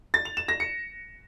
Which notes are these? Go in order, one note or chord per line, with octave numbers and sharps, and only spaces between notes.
A6
F7
E7
A#6
C#7